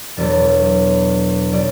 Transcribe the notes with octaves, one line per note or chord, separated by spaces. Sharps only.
E1 E2 B2 F#3 D4 D5
B2 F#3 D4 D5